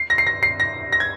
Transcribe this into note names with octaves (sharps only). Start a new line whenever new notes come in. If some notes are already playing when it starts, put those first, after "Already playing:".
Already playing: C7
A#6
C7
A#6
C7
A#6
A#6
G#6